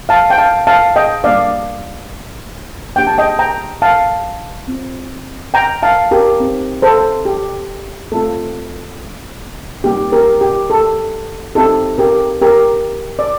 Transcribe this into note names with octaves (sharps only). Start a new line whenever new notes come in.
F5 A5
G5
F5 A5
F5 A5
D#5 G5
G3 A#3 D4 D5 F5
A#3 D4 G4 G5
A5
D#5 G5
G5 A#5
F5 A5
C4 F4
G5 A#5
F5 A5
G4 A#4
C4 D#4 G4
A4 C5
G4
A3 C4 F4 A4
G3 A#3 D#4 G4
G4 A#4
G4
A4
C4 D#4 G4 A4
G4 A#4
G4 A#4
D5